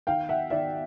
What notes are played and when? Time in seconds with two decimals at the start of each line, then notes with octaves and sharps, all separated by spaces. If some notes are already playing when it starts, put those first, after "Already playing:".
0.07 D#3 F5 G5
0.29 E5 F#5
0.50 D#3 D5 E5